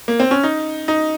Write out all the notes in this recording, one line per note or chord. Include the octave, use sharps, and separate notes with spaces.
A#3
C4
C#4
D#4
D#4